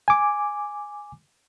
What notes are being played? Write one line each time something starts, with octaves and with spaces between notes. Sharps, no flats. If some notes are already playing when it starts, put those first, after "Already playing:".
G#5 D6